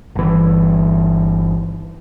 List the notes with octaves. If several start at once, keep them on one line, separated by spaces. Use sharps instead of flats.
G1 E3